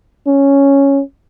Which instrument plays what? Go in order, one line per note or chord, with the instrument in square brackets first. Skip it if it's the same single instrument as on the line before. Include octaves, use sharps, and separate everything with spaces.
[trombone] C#4